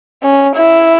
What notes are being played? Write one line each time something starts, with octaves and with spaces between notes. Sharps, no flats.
C#4
E4